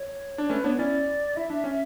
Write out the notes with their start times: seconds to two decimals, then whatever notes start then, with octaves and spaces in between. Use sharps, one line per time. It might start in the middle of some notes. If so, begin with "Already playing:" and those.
Already playing: C#5
0.38 D4
0.49 A3 C#4 B4
0.64 B3 D4 C#5
0.78 C#4 E4 D5
1.36 E4 E5
1.50 D4
1.64 C#4